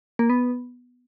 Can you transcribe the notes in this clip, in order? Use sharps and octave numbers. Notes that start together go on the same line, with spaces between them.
A#3
B3